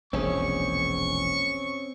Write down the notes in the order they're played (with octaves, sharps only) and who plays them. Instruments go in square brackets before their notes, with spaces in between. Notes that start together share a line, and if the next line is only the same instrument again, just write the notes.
[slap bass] E1 A#1 E2 [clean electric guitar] C4 C#4 G#4 [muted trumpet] C#6